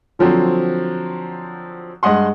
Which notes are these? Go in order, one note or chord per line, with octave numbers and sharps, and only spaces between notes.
D3 F3 F#3 C4
G2 G#3 D#5 F#5 C6